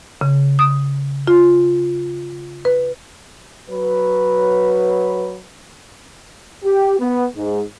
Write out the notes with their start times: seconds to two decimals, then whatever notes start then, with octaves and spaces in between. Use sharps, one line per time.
0.21 C#3
0.59 D#6
1.27 F4
2.65 B4
3.70 F#3 B4
6.65 G4
6.99 B3
7.36 G#2